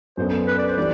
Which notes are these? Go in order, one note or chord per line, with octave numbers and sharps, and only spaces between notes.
F#2 F#3 B3 D4 A4 C5
B4
D5
C5
E3 G3 D4 D5